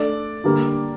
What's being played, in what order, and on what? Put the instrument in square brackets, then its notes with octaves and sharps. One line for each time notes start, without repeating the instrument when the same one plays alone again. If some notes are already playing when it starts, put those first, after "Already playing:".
Already playing: [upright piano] A3 D4 A4 [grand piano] D5
[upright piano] D3 G3 A#3